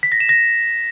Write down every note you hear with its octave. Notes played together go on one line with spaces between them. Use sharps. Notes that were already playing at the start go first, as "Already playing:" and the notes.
B6
A#6
E7
A#6